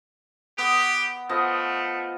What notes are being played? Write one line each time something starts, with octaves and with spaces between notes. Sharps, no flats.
B3 G4
F3 A3 B3 D#5